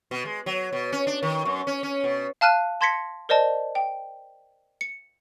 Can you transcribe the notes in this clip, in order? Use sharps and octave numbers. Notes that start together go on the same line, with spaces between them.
B2
G#3
F#3
B2
C#4
D4
D#3
F#2
C#4
C#4
B2
F5 A5 F6 F#6 D#7
A5 C6 G#6 A#6 B6 C#7
A#4 C5 D5 D#5 A5
G5
C#7